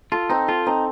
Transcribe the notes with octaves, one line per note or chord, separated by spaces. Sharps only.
F4 A4
C4 D#4
F4 A4
C4 D#4